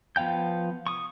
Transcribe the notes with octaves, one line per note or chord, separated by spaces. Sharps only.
F3 B3 F5 G5 G6
C#6 D#6